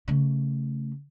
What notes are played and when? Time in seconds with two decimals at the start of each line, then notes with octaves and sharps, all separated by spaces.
0.08 C#3 A3